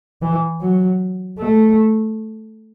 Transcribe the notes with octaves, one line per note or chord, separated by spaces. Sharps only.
E3
F#3
A3